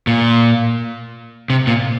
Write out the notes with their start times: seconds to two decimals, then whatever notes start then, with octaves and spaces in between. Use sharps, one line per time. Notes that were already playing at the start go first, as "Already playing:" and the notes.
0.07 A#2
1.50 C3
1.67 A#2